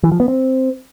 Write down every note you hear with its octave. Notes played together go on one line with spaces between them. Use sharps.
E3
F3
B3
C4